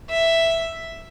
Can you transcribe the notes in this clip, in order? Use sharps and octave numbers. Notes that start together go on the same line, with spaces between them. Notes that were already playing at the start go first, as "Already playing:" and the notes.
E5